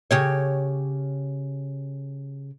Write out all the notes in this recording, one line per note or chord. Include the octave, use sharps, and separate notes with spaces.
C#3 G4 C#5